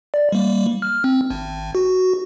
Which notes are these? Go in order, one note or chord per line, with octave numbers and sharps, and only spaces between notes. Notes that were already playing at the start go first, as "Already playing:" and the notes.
D5
G3 A#3
F6
C4
G#1
F#4